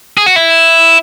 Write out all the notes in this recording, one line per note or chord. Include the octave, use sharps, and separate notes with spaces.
G#4
F#4
E4